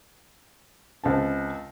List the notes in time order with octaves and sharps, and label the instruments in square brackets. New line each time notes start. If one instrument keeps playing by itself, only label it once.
[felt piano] C#2 C4 A5